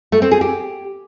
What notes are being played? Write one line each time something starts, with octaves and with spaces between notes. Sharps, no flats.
A3
C4
G#4
G4